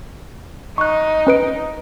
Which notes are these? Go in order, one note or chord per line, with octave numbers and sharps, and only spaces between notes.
D#4 C#6 F#6
C#4 B4 D7